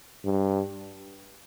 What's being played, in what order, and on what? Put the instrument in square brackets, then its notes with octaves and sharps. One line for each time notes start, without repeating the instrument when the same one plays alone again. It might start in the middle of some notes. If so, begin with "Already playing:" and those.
[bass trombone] G2